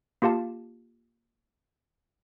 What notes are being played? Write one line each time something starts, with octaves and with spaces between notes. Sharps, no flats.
A#3 F4 G4 F5 A5